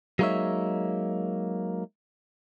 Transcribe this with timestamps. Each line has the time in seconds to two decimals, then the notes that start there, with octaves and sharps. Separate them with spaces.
0.19 F#3 G#3 A#3 D#4 C#5 E5